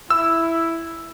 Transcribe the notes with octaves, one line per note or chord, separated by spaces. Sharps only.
E4 E6